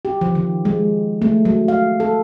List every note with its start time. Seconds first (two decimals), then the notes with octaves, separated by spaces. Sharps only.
0.05 G4
0.21 F3
0.35 D#3
0.65 G#3
1.22 A3
1.45 F#3
1.68 F5
2.00 A4